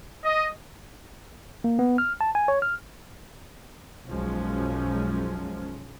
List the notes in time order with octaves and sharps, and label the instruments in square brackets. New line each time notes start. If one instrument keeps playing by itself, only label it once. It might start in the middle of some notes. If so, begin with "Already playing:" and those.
[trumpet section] D#5
[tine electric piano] A#3
B3
F6
A5
G#5
C#5
F6
[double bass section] B1 F#2 F3 G#3 C#4